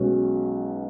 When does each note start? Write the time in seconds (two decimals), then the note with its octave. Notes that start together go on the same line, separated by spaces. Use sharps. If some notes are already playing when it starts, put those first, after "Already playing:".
Already playing: B1 B2 G#3 C#4